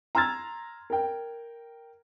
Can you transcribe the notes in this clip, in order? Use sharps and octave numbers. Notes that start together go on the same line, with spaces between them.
A#5 C6 E6 F6 G#6 A6
A#4 G5